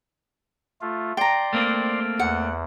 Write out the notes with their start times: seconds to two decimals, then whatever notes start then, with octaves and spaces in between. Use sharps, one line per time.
0.81 A3 F4
1.17 D5 G5 A#5 C6
1.53 A3 A#3 C4
2.19 E2 F#5